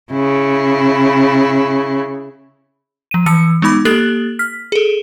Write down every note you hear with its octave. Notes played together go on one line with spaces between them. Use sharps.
C#3 E4
F3 D#7
E3 E6 C#7
G#3 B3 D#4 B5 D6
A#3 G4 A4 F#6 A6 F#7
F6 B6
G#4 A4